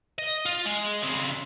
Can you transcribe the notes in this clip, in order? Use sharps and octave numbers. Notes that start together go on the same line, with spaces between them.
D#5
F4
G#3
C#3 C4